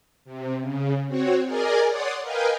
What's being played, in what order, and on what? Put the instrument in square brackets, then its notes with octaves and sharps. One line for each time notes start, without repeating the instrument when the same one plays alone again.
[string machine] C3
C#3
C4 F#4 C#5
G#4 A#4 D5 D#5 G#5
C#5 D5 F#5 C6 D#6
A#4 B4 D#5 F5 G5 G#5